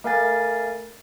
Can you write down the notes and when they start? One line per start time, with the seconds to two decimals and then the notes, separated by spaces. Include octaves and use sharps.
0.04 A3 A#4 F5 G#5 A6